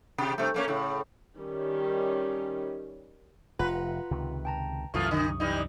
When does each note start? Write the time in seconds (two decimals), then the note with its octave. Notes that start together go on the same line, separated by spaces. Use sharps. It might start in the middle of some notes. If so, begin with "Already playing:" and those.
0.18 C3 G4
0.38 G2 C3 A3
0.54 A3 A#3 C#4
0.68 A2 C#3
1.37 D#3 G3 C#4 G4
3.59 F1 F4 B4 F#5 A#5
4.11 C#2 C3 D#3
4.45 G5 A5 A#5
4.94 C2 F#2 E3 A3 F4 C#6 D#6
5.11 D3 D#4
5.40 E3 G3 D#4